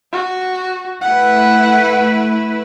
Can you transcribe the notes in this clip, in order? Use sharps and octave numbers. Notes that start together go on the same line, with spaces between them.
F#4
A3 E4 B4 F#5